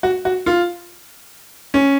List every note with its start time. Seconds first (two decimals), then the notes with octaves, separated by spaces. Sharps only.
0.03 F#4
0.25 F#4
0.46 F4
1.74 C#4